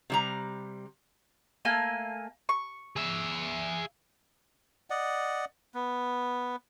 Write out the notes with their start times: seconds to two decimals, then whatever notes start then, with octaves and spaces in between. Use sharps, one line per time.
0.10 C3 G3 A#5
1.65 A3 A#3 G#5
2.49 C#6
2.96 G#4 E5
4.90 D5 D#5 F#5
5.74 B3